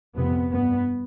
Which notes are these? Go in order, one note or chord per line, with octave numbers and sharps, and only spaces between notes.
F2 C3 B3
G2 B3